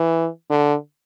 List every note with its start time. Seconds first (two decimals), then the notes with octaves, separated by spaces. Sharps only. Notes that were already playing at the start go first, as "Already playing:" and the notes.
Already playing: E3
0.50 D3